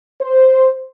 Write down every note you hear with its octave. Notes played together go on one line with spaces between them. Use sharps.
C5